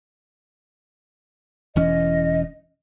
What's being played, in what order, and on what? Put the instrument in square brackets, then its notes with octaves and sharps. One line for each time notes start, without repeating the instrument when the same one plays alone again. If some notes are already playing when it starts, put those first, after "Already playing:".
[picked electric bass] E1 E3 C#4 [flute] D#5